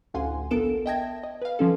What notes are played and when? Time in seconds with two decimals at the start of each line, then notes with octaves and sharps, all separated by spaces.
0.14 A1 D2 F5 F#5 G#5 C6
0.51 A#1 B3 A4 A#4 D7 E7
0.86 D#5 E5 G5 A5 G#6 A#6
1.24 D#5
1.42 B4 F5
1.59 F3 C#4 A4